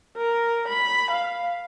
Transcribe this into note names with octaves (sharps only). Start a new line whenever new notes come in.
A#4
B5
F5